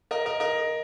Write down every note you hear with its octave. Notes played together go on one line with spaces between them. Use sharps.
A#4 D#5
A#4 D#5
A#4 D#5